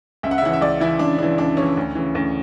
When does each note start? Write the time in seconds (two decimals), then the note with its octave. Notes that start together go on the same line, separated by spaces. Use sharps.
0.23 C#2 E5
0.31 F#5
0.38 E5
0.42 C#3 E3 F#5
0.53 E5
0.61 C#2 D5
0.81 C#3 E3 E4
0.99 C#2 D4
1.19 C#3 E3 D4
1.38 C#2 D4
1.57 C#3 E3 C#4
1.77 D2
1.95 C#3 E3
2.15 D2